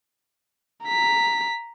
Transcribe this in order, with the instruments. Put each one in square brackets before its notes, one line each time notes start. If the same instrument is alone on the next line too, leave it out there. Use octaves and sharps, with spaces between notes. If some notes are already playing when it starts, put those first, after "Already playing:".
[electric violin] A#5 B6